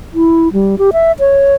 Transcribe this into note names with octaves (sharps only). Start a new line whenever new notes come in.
E4
G3
G4
E5
C#5